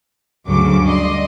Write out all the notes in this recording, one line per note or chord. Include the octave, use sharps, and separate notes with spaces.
D2 G2 C#3 F#3 D6
D5 D#5 C6